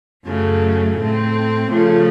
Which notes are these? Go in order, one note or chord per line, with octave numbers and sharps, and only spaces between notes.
F#2 C#3 F#3 A3
A2 A3 C4
C#3 F3 A3